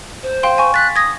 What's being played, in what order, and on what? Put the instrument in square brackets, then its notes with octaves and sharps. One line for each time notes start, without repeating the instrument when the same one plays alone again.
[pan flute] C5
[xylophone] F5 G5 C6
G#5 C#6
[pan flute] F#6 [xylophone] A6 B6
[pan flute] D#6 [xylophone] G#6 A#6